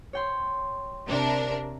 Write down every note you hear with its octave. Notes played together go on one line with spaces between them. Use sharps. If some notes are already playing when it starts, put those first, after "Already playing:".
C#5 G5 C6
C3 D4 A#4